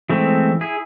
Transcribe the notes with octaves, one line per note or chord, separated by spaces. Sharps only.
E3 G#3 A3 C4
E4 G#4